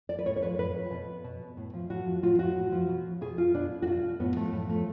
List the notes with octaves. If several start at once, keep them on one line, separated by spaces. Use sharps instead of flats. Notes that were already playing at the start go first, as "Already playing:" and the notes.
D5
B4
A2 C#5
C#5
F3 B4
A2 B4
F3
B2
B2
A2
F3
A2 F#4
F3
A2 F4
F3 F#4
A2
F3
B2
B2 G#4
F4
B2 D4
F#4
B2 F4
A2 B3
F3 A3
A2 A3
F3 A3